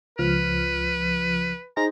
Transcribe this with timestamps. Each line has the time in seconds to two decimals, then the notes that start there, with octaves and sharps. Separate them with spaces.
0.19 C#2 F3 B4 F6
1.77 D#4 G#4 C5 A#5